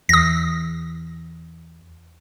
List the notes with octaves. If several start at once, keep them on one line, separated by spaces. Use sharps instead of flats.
E2 D#6 A#6